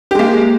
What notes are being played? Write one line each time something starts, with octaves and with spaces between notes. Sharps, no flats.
G#3 A#3 G4